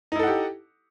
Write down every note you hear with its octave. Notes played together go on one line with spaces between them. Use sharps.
D#4 E4 G4 A4 F#5